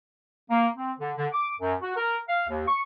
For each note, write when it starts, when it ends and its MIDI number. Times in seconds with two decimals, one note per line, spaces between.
0.51 0.67 58
0.77 0.92 60
1.00 1.12 50
1.18 1.27 50
1.33 1.54 86
1.60 1.74 42
1.82 1.94 66
1.96 2.17 70
2.29 2.47 77
2.49 2.65 39
2.67 2.81 85